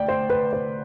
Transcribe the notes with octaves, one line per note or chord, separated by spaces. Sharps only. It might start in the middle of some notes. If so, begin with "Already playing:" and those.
Already playing: D2 D5 G5
C5
B4
C5